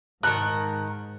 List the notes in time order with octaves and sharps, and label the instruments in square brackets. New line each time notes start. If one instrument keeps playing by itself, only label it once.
[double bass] G#2 [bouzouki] D#3 A#4 [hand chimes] A5 A#5 C#7 [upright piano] F#6